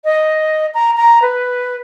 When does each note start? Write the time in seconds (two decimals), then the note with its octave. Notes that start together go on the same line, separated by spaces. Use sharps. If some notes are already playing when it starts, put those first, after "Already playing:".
0.04 D#5
0.74 A#5
0.97 A#5
1.22 B4